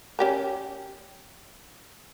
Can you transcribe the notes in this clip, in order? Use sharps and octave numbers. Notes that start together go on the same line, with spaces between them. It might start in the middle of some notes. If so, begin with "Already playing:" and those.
C#4 G4 A#4